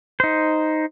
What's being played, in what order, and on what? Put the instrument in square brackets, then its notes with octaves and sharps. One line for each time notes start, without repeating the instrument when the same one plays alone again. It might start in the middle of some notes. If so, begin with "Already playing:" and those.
[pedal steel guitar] D#4 C5